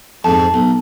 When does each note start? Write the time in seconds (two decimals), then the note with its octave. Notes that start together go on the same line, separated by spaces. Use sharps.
0.24 F2 G#2 A5
0.54 B1